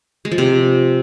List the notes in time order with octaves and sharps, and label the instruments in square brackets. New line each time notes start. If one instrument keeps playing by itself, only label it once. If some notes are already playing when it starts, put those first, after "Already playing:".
[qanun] G#3
F3
C3